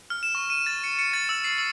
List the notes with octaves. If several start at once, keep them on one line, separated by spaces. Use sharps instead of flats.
F6
E7
C#6
D#7
A6
C#7
C#7
A6
E6
C7
E6